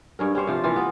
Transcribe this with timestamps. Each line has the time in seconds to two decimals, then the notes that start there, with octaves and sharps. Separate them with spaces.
0.19 G2 C#4 A#4
0.35 C#4 G4 C5 C#5
0.47 C3 F3 F4
0.63 E3 A#3 F4
0.76 B3